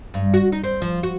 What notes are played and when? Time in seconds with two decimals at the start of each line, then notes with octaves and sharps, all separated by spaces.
0.14 G2
0.34 F#4
0.52 D#4
0.64 C4
0.82 F3
1.03 F#4